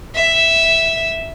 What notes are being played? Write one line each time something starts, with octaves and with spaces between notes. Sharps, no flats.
E5